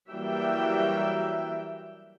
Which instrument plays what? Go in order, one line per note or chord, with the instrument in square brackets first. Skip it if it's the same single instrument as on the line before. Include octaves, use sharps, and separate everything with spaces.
[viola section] E3 F#3 G3 A#3 E5 G5